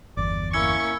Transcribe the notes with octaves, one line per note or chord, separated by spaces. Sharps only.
G1 E2 D5 D6
A#3 C#4 E4 C#6 E6 G#6 C#7